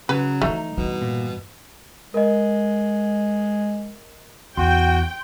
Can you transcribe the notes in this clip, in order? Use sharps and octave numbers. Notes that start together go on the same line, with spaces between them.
C#3 F#3 B4
E3 F3 A3 D#4
G2 B2 E3
A#2
G#3 A#4 D#5
E2 F#4 G5 C6